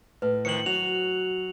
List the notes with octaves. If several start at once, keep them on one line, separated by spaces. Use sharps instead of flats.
A2 B4
D#3 F3 C#7 F#7
F#3 F#4 F7